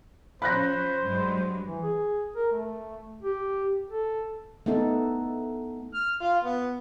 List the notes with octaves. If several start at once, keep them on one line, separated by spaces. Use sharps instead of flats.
F3 C#4 C5 B5 F#6 A#6
G2 F#3 G#3
E3
G#4
A#4
A3
G4
A4
A3 B3 D#4 A4
F6
F4
B3